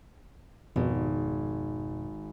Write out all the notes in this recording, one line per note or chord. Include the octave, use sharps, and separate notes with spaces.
G#1 F2 B2 D#3